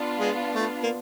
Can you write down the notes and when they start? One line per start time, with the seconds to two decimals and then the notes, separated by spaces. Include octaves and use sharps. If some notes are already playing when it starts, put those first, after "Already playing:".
Already playing: B3 D4 F4
0.20 G#3
0.55 A3
0.84 A#3